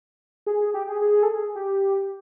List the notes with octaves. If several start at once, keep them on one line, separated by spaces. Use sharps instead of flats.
G#4
G#4
G4
G#4
G#4
A4
G#4
G4